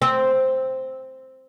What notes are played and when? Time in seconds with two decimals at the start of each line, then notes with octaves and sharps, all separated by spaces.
0.02 C4